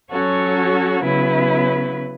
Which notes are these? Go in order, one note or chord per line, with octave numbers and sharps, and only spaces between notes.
F#3 C#4 F#4 A4 C#5
C#3 F#3 B3 E4 B4